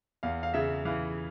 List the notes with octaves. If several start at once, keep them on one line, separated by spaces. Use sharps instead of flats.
E2 F5
F5
C#3 E5
E3 F5